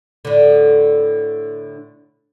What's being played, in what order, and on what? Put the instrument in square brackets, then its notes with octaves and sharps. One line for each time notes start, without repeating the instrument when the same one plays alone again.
[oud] A2 D3